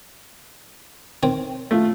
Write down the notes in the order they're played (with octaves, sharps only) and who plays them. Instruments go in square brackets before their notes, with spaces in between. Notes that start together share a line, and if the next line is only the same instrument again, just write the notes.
[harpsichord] D#3 C4 C#5
[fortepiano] A3 F4